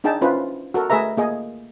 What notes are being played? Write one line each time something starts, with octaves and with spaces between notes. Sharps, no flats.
D4 D#4 G#4 G5 A5
C#4 E4 F4 B4 C5
F#4 A4 A#4
A3 G#4 B4 E5 A#5
A#3 G#4 D#5